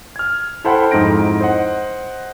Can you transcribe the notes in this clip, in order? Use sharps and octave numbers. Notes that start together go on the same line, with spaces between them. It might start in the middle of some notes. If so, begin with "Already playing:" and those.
F6 G#6
E4 A4 C5 F#5 G5 B5
F2 G#2 D#4 E4 A#6 D7
C5 D#5 F#5